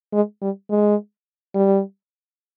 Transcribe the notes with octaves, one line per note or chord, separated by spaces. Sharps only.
G#3
G3
G#3
G3